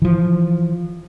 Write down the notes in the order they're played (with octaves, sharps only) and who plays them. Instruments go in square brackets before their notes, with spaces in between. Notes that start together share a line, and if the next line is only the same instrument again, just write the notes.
[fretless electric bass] E3 F3